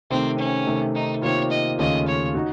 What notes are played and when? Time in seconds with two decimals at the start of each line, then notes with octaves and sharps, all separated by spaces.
0.10 C3 D#3 A3 C4
0.38 C#4
0.67 C3 D#3 A3
0.94 D#4
1.22 C3 D#3 A#3 F4 C#5
1.50 D#5
1.79 D#2 C#3 A3 C#4 F4 D#5
2.07 C#5
2.35 D#4 F#4